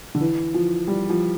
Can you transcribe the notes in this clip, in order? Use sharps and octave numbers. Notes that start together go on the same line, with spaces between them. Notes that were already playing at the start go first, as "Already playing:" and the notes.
D3
E3
F3
G3
F3